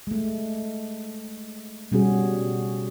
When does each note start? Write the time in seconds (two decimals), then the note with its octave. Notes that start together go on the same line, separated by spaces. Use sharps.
0.07 G#3 A3
1.92 B2 G3 C#4 F#4 G#4